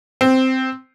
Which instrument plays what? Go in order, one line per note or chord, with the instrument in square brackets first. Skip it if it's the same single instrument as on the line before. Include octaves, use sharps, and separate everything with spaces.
[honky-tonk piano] C4